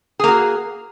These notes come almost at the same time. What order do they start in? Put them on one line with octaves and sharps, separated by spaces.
G#4 A#3 F#4